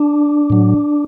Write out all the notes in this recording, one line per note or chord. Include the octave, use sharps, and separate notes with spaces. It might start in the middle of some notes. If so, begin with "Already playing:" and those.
Already playing: D4
A2 F#3